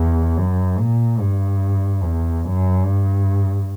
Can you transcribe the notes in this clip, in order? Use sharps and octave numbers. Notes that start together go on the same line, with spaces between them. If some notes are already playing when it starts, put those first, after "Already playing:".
Already playing: E2
F#2
A#2
G2
E2
F#2
G2